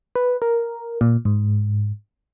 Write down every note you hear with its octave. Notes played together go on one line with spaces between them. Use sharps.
B4
A#4
A#2
G#2